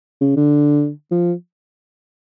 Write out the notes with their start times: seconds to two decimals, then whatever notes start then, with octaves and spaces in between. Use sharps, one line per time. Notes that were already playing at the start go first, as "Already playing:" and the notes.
0.21 C#3
0.36 D3
1.11 F3